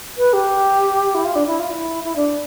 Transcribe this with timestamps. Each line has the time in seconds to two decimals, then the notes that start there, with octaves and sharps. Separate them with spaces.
0.17 B4
0.33 G4
1.14 E4
1.24 F4
1.35 D4
1.46 E4
1.59 F4
1.69 E4
2.04 E4
2.16 D4